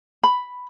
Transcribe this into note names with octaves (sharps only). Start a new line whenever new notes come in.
B5